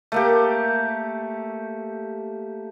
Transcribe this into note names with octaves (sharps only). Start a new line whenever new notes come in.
A3 A#3 G4